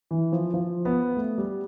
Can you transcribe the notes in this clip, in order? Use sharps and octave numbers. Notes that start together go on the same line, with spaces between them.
E3
F3
F3
B3
A3
G3